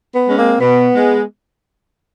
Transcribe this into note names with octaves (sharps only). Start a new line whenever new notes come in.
B3
G#3 C#4
A#3 C4
B2 B3
G#3